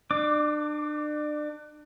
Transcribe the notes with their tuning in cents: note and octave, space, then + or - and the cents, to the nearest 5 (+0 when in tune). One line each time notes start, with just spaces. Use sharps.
D4 +35 D6 +0